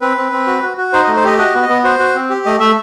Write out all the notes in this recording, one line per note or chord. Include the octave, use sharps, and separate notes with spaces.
C4 B4
C4
C4
F#4
F#4
F#4
D#4 C5
D#5
A3
C5
G4 D#5
F#4 D#5
B3
D#5
B3
F#4 C5
F#4
C4
G4
A3 D#5
A3 E5